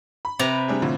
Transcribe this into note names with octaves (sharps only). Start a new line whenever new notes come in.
B5
C3 B4 A#5
G3 D4 G#4
A2 D3 F3